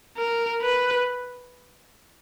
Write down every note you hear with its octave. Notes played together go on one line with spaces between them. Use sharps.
A#4
B4